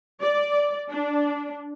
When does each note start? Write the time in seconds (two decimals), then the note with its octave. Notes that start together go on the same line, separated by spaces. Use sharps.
0.22 D5
0.90 D4